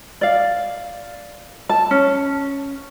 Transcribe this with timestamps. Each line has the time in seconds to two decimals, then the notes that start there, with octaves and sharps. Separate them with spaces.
0.21 D5 F5
1.69 A5
1.91 C#4